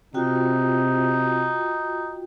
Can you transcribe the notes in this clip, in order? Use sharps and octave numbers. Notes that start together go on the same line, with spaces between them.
C3 D#4 F4 F#4 G5